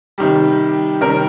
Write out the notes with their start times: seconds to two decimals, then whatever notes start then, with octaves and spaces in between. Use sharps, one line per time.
0.18 C3 D#3 G3 G4
1.01 C3 D#3 G3 A#4